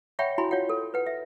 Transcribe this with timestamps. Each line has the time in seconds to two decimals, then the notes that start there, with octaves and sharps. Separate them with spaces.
0.19 C#5 E5 F#5 G5 B5 C#6
0.38 E4 F#4 G#5 B5 C6
0.51 F4 C#5 F5 F#5
0.69 A4
0.94 B4 F#5
1.07 E5